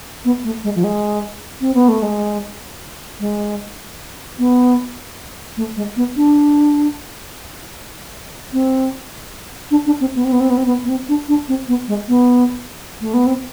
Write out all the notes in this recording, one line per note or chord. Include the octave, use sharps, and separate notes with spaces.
B3
A3
G#3
F3
G#3
C4
B3
A3
G#3
G#3
B3
A3
G#3
B3
D4
C4
D4
D4
C4
B3
C4
B3
C4
B3
C4
B3
B3
C4
D4
D4
C4
B3
G#3
B3
A3
B3
C4